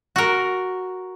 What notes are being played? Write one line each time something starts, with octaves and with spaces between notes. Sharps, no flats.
F#4 A#4